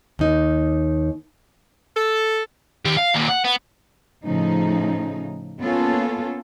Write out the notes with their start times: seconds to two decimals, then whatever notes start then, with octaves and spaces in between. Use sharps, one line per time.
0.19 D#2 D#4
1.96 A4
2.85 D#3 G4
2.97 F5
3.14 D#2 A#2
3.29 F#5
3.44 B3
4.24 A2 C#3 F3 D#4
5.60 A#3 B3 C#4 F4 A4